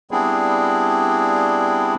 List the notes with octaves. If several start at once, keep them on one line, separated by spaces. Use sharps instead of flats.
G3 B3 C4 D4 E4 G#4